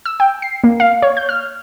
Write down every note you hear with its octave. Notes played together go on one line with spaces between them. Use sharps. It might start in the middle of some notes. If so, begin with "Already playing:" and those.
E6
G5
C7
A#3
F5
C#5
G6
F6